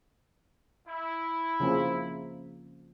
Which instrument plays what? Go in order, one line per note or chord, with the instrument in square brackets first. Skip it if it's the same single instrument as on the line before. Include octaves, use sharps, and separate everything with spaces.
[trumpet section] E4
[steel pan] C#3 F3 A#3